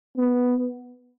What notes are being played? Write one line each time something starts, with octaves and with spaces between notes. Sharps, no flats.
B3